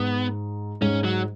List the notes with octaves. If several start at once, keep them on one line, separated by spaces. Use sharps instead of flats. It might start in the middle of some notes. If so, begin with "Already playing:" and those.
Already playing: G#2 B3
G#2 C#4
F#3